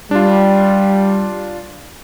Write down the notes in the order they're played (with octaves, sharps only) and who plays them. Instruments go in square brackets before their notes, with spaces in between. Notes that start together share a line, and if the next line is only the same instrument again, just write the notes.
[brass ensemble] G3 [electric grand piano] D4 F4